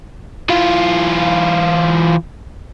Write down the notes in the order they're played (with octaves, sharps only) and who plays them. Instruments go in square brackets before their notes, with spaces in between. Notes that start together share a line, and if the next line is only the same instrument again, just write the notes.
[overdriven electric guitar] E3 F4